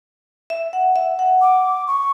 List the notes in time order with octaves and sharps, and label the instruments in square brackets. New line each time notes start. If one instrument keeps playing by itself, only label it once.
[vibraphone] E5
F#5
E5
F#5
[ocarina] D6
C#6